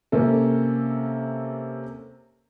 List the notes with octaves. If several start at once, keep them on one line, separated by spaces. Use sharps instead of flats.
C3 A#3 C#4 A4